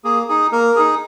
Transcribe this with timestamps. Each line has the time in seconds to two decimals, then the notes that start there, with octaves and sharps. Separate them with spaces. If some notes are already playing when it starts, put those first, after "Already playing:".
0.04 A#3 G#4
0.28 D#4 G#4
0.52 A#3 A#4
0.76 D#4 G#4